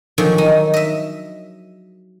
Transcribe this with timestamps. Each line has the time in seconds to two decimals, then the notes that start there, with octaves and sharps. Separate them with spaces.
0.18 D3 D#3 F3 F#3 G#4 C#5
0.38 D#4
0.74 D#5 E5